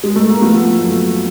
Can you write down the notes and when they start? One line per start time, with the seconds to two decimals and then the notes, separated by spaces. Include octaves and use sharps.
0.04 G#3
0.16 A3
0.30 A#3
0.42 F3 A3 B3
0.79 F#2